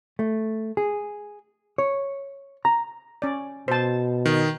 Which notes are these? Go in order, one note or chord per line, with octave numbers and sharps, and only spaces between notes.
A3
G#4
C#5
A#5
C#4 D5
B2 C5 A5
D#3